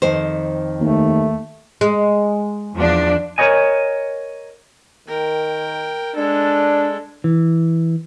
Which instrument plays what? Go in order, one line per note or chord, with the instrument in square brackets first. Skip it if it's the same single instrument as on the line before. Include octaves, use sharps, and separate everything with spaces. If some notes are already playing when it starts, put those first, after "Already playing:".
[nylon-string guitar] F2 D#3 C5
[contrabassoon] D#2 [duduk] A3
[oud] G#3
[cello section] E2 F3 D4
[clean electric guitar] A#4 B4 C#5 D#5 G#5
[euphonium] D#3 [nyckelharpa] A#4 G5
[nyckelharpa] G#3 A4 [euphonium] D4
[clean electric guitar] E3